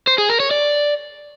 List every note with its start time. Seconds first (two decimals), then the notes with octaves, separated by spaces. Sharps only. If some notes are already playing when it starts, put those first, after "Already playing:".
0.07 C5
0.18 G#4
0.29 A#4
0.40 C#5
0.51 D5